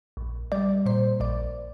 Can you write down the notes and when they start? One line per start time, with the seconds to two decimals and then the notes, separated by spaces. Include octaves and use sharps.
0.17 A#1
0.52 G3 D5
0.86 A#2 C5
1.20 A#1 D5